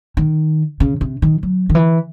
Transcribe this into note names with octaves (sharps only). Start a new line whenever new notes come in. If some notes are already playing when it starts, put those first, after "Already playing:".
D#3
C#3
C3
D#3
F#3
D#3
E3